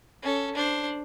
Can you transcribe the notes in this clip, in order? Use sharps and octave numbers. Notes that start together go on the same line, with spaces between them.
C#4 A4
D4 C5